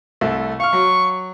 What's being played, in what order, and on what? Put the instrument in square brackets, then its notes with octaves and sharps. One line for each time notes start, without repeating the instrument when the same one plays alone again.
[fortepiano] C2 A3
[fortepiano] F5 F6 [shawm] C#6
[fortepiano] F#3